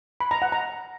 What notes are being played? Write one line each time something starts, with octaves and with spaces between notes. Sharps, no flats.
B5
A#5
F#5
A#5